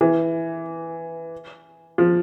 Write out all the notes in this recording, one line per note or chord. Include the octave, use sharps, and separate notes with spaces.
E3
F3